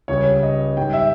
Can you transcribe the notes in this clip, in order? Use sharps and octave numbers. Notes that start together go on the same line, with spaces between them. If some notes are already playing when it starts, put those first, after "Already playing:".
C#2 C#3 G3 C#5
D#5
G#2 D#3 G3 G5
E5